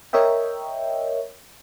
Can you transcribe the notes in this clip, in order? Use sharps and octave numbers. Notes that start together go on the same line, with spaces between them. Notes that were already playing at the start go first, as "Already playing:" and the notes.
A#4 C#5 D#5 E5 G5